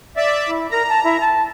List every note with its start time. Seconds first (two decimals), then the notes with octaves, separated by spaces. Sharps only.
0.17 D5 E5
0.48 E4
0.71 A#4 A#5
0.89 A5
1.04 E4
1.20 A5